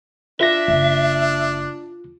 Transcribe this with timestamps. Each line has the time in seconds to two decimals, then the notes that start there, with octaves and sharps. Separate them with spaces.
0.41 D4 F4 E5 A#6
0.68 F#1